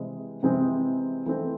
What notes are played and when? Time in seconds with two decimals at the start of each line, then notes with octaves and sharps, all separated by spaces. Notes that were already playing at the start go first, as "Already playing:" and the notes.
Already playing: C3 E3 G#3 C4
0.43 C3 E3 G#3 C4 G#4
1.26 E3 A3 C4